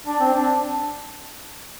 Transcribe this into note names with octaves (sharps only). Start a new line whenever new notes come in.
D4
C4
D4